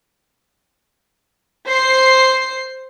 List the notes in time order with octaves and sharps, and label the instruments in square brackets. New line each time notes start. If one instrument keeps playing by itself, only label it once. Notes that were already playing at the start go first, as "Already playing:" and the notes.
[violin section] C5 C7